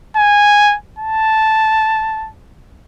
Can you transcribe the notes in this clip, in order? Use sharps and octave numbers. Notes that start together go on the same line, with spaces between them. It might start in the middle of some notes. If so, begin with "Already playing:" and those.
G#5
A5